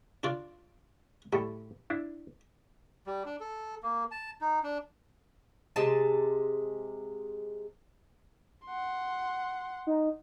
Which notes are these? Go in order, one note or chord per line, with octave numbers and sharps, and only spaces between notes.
D4 F4 D5
A2 G3 A4
D4 E4
G3
D4
A4
A#3
A5
D#4
D4
C3 G#3 A5
F#5 C6
D#4